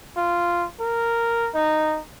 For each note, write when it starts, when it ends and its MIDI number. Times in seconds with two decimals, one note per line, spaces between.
0.17 0.65 65
0.80 1.49 70
1.54 2.00 63